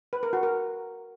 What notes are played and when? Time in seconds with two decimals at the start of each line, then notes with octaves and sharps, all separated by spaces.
0.13 B4
0.23 A#4
0.33 F#4
0.43 A#4